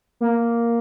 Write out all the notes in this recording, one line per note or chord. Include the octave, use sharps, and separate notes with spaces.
A#3